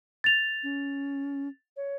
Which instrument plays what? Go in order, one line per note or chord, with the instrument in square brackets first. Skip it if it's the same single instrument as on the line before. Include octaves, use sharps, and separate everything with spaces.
[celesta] A6 F7
[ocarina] C#4
C#5